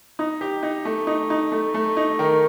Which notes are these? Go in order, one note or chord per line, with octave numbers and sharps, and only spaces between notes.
D#4
G4
D#4
A3
D#4
D#4
A3
A3
D#4
D#3